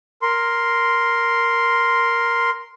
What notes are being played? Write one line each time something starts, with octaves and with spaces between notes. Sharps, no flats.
A#4 C6